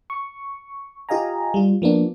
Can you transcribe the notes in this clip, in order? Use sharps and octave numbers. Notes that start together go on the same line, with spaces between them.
C#6
F4 G4 D#5 F5 G#5 A#5
G3 F4
F3 A#3 B3 D4